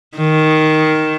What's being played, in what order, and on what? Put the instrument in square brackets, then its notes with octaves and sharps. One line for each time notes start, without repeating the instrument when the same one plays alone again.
[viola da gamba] D#3